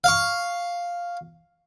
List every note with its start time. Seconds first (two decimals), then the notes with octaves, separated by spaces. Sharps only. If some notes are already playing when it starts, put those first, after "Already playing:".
0.04 F5 C#6